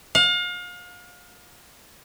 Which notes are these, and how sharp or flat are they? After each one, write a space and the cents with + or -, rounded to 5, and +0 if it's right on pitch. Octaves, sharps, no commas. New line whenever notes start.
F5 +35